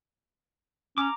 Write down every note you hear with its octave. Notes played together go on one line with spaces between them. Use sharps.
C#4 A#5 D6